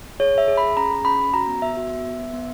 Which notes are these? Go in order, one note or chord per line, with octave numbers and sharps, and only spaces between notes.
G#4 C#5
G#4 E5
G#4
B5
G#4
C#4 A#5
G#4
C#4 B5
C#4
F#4 A#5
B3
B3 E5
F#4
B3
B3
B3
B3